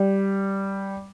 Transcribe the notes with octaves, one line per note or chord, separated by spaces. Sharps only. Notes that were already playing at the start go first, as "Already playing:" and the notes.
Already playing: G3